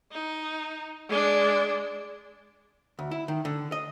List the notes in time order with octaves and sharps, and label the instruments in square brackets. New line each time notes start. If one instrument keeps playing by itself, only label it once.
[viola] D#4
G#3 D4
[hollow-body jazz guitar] D2
E4
D#3
D3
D#5